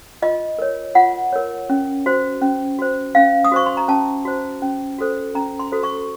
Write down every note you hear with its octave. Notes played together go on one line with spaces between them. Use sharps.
F4 D#5
A#4 C#5
F4 F#5
A#4 C#5
C#4
F#4 C5
C#4
F#4 C5
C#4 F5
D#6
F#4 C5 C#6
C6
A#5
C#4 A5
F#4 C5
C#4
F#4 A4 C5
C#4 A#5
C6
F#4 A4 C5
C#6